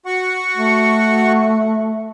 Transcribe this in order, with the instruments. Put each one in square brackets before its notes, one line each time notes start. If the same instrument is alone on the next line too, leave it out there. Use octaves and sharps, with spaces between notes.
[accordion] F#4 F#5 C#6
[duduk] A3